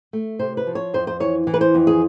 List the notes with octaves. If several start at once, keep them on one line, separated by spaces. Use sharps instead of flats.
A3
C3 C5
B4
F3
C#5
F2 C5
C5
E3 C#5
E3
B4
C5
F2
G#4